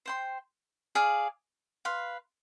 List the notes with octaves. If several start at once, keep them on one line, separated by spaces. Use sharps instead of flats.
C5 G5 C6
G#4 D5 F5 G#5
B4 F5 C6